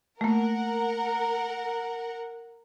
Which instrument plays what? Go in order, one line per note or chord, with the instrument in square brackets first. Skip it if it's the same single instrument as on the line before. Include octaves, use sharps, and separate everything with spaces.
[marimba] A3 A#3 [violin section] A#4 F#5